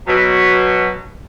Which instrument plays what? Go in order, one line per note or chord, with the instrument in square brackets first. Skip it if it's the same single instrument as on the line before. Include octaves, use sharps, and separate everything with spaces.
[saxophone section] B2 F#3